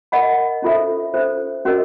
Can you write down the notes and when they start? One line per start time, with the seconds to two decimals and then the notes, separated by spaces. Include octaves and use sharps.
0.12 A#4 D#5 F#5 B5
0.62 C#4 F4 A4 C5 E5
1.14 C#4 F4 A4 C5 E5
1.65 C#4 F#4 A#4 D#5